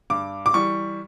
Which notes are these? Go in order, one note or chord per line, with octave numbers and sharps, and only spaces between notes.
G2 D6
D6
E3 G3 C#6